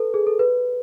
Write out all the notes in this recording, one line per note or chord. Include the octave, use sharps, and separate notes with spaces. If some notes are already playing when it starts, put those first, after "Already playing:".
Already playing: A4 B4
G#4
A4
B4